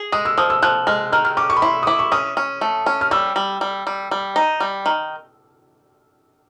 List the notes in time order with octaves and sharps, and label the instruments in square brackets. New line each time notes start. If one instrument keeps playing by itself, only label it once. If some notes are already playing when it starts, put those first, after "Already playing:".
Already playing: [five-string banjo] G#4
[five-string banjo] G#3 [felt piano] D#6
[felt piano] E6
[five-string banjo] F3 [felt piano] D#6
[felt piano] E6
[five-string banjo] F3 [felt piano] F#6
[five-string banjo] G#3 [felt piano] F6
[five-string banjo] D#3 [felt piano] F6
[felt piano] F6
[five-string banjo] C#4 [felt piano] D6
[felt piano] C#6
B5
[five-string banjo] E4 [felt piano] C6
[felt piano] D#6
[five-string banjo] E4 [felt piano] D6
[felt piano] C#6
[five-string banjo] C#4 [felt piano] D#6
[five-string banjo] C#4
A3
C#4
[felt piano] F6
[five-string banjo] G3 [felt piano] E6
[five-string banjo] G3
G3
G3
G3
D#4
G3
D#3